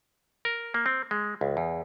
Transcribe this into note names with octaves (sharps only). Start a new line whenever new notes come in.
A#4
A#3
C4
G#3
C#2
E2